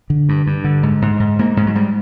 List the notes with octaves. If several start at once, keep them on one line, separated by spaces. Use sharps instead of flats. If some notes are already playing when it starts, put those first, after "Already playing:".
D3
G2
G2
D3
G#2
G#2
G#2
G#2 A#3
G#2 G#3
F#3
G#2 G3